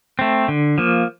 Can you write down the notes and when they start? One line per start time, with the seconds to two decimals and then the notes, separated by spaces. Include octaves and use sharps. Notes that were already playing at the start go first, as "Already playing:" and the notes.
0.19 A3 C4
0.48 D3
0.78 F3 A#3